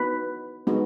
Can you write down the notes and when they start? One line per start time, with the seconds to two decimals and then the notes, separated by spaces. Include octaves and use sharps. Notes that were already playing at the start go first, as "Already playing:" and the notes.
Already playing: B3 D#4 F#4 B4
0.67 G#3 B3 D#4 F#4